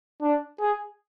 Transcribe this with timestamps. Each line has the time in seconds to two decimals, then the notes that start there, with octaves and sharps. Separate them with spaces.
0.22 D4
0.60 G#4